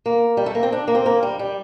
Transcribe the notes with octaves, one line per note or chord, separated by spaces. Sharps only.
A#3
G3
A3
A#3
C4
D4
A#3
C4
A#3
G3
G3